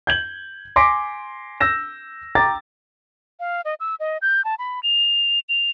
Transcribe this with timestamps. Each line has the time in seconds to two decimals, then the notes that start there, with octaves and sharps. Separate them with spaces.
0.07 G6 G#6 F#7
0.76 G#5 C6 D6 A#6 B6 D7
1.60 E6 G6 A#6 E7
2.35 G5 A#5 D6 A6
3.40 F5
3.65 D#5
3.80 E6
4.00 D#5
4.22 G6
4.45 A5
4.59 B5
4.83 F7
5.49 F7